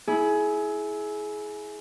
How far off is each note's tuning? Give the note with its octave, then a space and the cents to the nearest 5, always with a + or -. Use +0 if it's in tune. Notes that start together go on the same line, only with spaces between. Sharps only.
E4 -15 G#4 +20